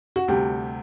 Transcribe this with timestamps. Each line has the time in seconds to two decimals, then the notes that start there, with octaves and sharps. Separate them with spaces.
0.16 F#4
0.28 D2 C3 G3 G4